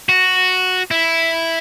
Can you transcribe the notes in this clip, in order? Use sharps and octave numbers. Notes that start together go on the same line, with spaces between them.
F#4
E4